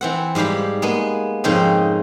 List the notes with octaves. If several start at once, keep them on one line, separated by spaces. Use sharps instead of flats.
E3 C4 F#5
G#2 G3 G4 F5 B5
G#3 A#3 B3
F2 G#2 C#3 C4 D#4